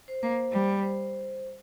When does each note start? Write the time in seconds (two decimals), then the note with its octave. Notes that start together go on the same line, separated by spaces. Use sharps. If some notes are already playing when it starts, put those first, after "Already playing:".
0.08 C5
0.23 A#3 C5
0.52 G3
0.82 C5